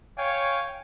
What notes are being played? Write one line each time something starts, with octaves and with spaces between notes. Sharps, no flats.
C#5 F5 G5 G#5